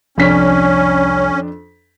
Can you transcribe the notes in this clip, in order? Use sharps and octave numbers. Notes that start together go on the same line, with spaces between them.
C2 F2 C#4 D4 B6